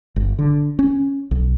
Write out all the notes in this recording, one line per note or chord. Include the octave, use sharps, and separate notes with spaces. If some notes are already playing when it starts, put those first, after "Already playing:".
G1
D3
C#4
B1